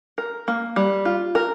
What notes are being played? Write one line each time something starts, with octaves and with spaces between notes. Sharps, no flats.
A#4
A#3
G3
F4
A#4